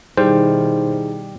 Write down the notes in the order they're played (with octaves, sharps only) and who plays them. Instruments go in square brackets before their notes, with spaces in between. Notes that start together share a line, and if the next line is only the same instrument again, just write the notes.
[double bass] B2 D#3 [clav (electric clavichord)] G3 [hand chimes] D#4 E4 G#4 [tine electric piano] C5